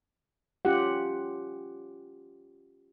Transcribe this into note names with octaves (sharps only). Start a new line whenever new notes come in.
C#4 F4 G4 F#5